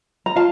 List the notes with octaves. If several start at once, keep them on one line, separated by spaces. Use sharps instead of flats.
A#5
F4 F5 A5